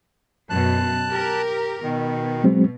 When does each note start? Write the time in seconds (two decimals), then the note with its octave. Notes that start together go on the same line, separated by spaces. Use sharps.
0.50 F#2 B2 A5 F#6
1.09 G4 A#4
1.83 B2 D#3
2.44 F#3 G#3 C4